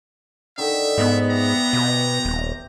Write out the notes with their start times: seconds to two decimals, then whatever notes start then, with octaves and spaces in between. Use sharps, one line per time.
0.58 D3 D#3 D#4 E5
0.98 G#2 B3 F4 D#5
1.30 G4 E5 A#5
1.73 B2 G4 C5
2.25 D#1